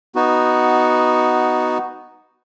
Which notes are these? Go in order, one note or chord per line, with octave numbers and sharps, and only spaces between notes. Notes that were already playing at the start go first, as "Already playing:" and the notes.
B3 D#4 F#4